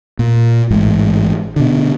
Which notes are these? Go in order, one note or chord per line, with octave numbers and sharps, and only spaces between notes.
A#2
A1 G#2
B2 D3